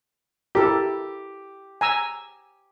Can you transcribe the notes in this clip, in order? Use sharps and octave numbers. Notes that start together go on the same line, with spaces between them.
E4 G4 A4 A#4
G#5 A#5 E6